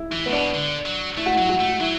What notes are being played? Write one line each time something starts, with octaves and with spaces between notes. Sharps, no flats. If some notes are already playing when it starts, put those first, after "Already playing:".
Already playing: E4
E3 E4
A2 B3
B2 D4
D3
F#3
A3 E4
F#4
F#3 E4
F#4
A3
F#3 E4